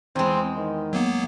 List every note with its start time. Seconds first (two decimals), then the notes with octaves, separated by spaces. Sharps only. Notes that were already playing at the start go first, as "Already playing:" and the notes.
0.16 E2 G#3 C4
0.57 D#3
0.93 F#3 A#3 B3